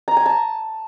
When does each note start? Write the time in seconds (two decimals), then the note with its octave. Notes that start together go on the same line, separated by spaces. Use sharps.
0.08 A#5
0.17 G#5
0.26 A5